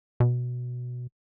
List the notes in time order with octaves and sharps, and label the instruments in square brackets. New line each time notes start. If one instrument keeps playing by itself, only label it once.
[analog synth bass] B2